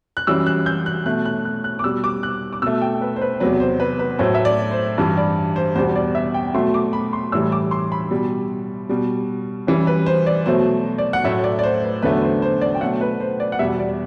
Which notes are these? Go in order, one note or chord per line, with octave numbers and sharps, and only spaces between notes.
F#6
F#2 E3 G3 E6
F#6
G6
F#6
B2 A3 F#6
F#6
F#6
F#6
D6
B2 G3 E6
D6
F#6
D6
B2 A3 E6
G5
B4
C5
B4
E2 C3 F#3 B4
C5
B4
B4
A2 F#3 A3 C5
E5
D5
C5
G2 E3 G3
D5
C5
E2 B2 G3 C5
D5
E5
G5
B2 F#3 A3 C6
D6
B5
C6
A2 E3 G3 E6
D6
C6
B5
B2 G3
B2 G3
F#2 E3 G3
B4
C5
D5
B2 F#3 A3 C5
D5
F#5
A2 F#3 A3 E5
D5
D5
C5
B4
E2 D3 F#3 A3 B4
C5
C5
D5
G5
B2 F#3 A3 F#5
B4
C5
D5
F#5
E2 B2 G3 E5
D5